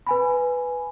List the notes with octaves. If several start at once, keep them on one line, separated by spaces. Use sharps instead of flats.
B4 G#5 B5